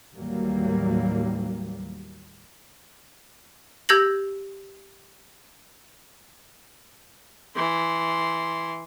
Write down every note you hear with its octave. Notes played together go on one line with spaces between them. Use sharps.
D#2 A2 E3 F#3 G3 A#3
G4 E6 G6 G#6 A#6 F#7
E3 C6